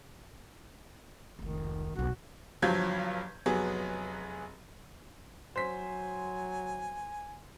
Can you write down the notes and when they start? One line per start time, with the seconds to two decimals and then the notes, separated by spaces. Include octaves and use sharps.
1.39 F1 C#2 D#3
1.95 D#1 B1 F#4
2.62 G1 G2 F3 F#3 G6 G#6
3.46 F1 F#3 B3 G#4
5.56 F#3 C5 G#5 B6